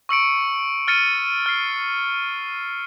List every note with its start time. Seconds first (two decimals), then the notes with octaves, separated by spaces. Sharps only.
0.09 C#6 E6 C#7 D7
0.88 F6 A6 C#7 D#7
1.46 F6 C7